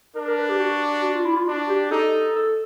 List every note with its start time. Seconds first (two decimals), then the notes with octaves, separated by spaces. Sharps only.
0.15 D4 A#4
0.27 A#4
0.38 B4
0.49 G4
0.60 F#4
1.04 F#4
1.14 F4
1.25 E4
1.36 F4
1.47 D4 F#4
1.69 G4
1.91 D#4 A4
2.36 A4